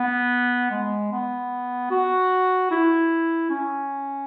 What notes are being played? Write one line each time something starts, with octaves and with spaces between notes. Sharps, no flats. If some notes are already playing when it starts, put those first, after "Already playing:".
Already playing: B3
G#3
B3
F#4
E4
C#4